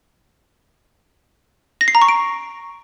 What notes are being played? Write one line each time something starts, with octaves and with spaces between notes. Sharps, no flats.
A#6
C7
A#5
C#6
D7